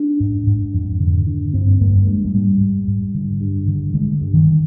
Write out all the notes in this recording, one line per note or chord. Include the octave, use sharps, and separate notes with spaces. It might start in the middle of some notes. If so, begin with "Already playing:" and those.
Already playing: D4
G#2
G#2
F2
D3
D3
G2 C4
G2 A#3
G2 G#3
G#3
G#2 G3
G#2
G#2
D3
G2
D3
D3 G#3
G2
D#3